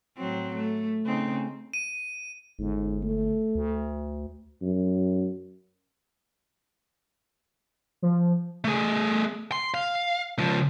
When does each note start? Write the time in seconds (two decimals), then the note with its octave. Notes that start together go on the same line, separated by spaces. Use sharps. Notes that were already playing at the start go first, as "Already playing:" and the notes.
0.17 A2 F#3 C4
0.55 A3
1.05 C#3 C4 D#4
1.74 D#7
2.59 G1 G#2
3.03 A3
3.55 D2
4.62 F#2
8.02 F3
8.65 A3 G#4
9.52 C6
9.74 F5
10.38 C#2 F3